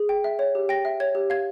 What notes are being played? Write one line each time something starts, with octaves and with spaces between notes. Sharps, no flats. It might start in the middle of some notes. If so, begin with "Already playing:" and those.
Already playing: G#4
G5
E5
C#5
G4
G5 A#6
E5
C#5 G#6
G4
F5 G#6